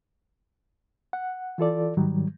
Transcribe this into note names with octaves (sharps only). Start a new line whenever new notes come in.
F#5
E3 F4 A4 D5
G#2 D#3 F#3 G3